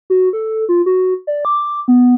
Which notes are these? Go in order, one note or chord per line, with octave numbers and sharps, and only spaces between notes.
F#4
A4
F4
F#4
D5
D6
B3